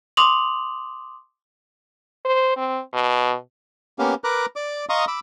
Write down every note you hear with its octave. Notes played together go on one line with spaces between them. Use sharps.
C6 D6 D#6 F7 F#7
C5
C4
B2
A#3 B3 C#4 G4 F5
A#4 B4 A#5 D6 F#6
D5 D6
D#5 F5 A#5 C6 C#6 D#6
B5 D6 E6